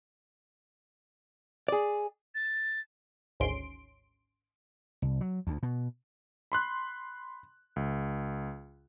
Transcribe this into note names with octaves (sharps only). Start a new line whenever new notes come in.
G#4 D5
A6
G#1 D2 G#2 C#4 C6 D7
C2
F#3
D2
B2
B5 C6 F#6
C#2